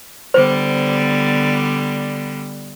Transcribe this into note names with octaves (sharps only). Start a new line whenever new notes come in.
D3 G3 B3 C5